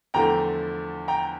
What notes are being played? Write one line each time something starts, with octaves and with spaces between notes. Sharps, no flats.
E2 D3 F3 A3 G5 A#5
G5 A#5